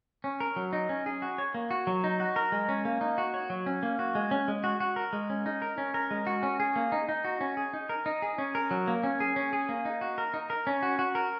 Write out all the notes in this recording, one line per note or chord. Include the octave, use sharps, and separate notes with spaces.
C#4
A#4
F#3
D#4
C#4
G#4
F#4
C#5
A#3
F#4
F#3
D#4
F#4
A#4
G#3
C#4
A#3
D#4
F#4
C#5
F#3
C#4
A#3
F#4
G#3
C#4
G#3
F#4
F#4
A#4
G#3
C#4
D#4
A#4
C#4
A#4
G#3
F#4
C#4
G#4
A#3
D#4
D#4
F#4
C#4
G#4
D#4
A#4
D#4
G#4
C#4
A#4
F#3
A#3
C#4
G#4
C#4
G#4
A#3
D#4
F#4
A#4
D#4
A#4
C#4
F#4
F#4
A#4